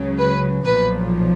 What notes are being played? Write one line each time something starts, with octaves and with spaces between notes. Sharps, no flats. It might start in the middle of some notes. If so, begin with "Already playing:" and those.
Already playing: C#2 C#3 F#3
B4
B1 A#2 F3 B4